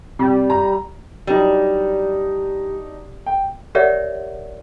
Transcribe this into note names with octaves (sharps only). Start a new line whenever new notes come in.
C3 G3
A#5
F#3 G3 D4 D#4
G5
G4 A#4 C#5 D5 E5 F#5